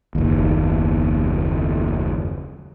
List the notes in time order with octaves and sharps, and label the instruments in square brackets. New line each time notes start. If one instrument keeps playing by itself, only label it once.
[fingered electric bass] F#1 D#2